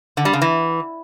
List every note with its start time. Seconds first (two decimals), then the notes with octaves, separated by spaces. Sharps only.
0.17 D3
0.25 G3
0.33 C#3
0.42 E3